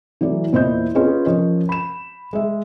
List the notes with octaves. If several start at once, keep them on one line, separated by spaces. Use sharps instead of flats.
E3 F#3 A3 D5
E2 A#2 E4 C5 D#5 G6
C#4 F4 G#4 B4 D#5
F3 C#4 A#4 D#5
B5 E7
G#3 E5